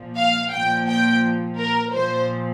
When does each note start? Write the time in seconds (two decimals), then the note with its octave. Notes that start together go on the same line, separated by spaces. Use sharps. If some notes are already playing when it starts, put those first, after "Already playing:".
Already playing: A#2 F3
0.18 F5
0.52 A#2 F3 G5
0.88 G5
1.58 A#4
1.93 A#2 F3 C5